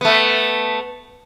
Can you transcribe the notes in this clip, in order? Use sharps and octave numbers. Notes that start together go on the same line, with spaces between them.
A3 B3